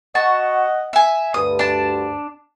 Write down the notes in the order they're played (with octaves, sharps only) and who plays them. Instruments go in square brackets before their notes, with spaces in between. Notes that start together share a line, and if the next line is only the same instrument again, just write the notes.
[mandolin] F#4 A5 [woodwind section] D#5 F#5
[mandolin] E5 G#5
[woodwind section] D2 G2 [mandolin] D#6
[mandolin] D4 A5